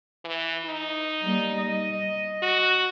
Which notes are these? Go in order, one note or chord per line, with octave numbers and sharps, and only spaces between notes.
E3
D#4
G3 A#3
D#5
F#4